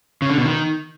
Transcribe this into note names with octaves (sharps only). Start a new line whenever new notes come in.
C#3
D3
B2
D#3